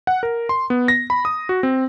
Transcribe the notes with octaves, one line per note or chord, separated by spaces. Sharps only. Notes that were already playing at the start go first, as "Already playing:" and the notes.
F#5
A#4
C6
B3
A#6
B5
D#6
F#4
C4